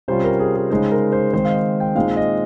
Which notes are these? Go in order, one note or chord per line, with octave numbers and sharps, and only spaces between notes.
C3 G3 C#4 F4 C5
A#4
G#4
G#4
C#3 G#3 D#4 C5
A#4
C5
D#3 G#3 C4 C5
F5
D#5
G5
A#2 G#3 C4 D#4 F5
D#5